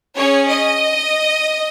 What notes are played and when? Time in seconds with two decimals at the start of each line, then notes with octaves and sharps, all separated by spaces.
0.16 C#4 G#4 C#5
0.48 D#5